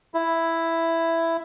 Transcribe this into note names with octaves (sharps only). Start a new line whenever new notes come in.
E4